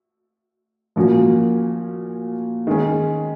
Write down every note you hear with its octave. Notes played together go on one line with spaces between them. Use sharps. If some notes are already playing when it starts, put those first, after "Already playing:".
A#2 F3 A#3 C#4 F#4
D#3 G#3 C#4